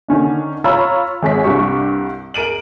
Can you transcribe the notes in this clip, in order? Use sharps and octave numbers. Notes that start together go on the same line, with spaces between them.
D3 D#3 C#4 D4
F4 C#5 A#5 B5 E6
G#1 G#4 C#5 B6
C2 G2 G3 G4 C#6
G#4 A#4 D7 D#7 F#7